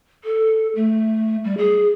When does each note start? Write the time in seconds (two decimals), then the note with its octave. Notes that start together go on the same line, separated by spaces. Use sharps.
0.24 A4
0.75 A3
1.44 G3
1.58 G#4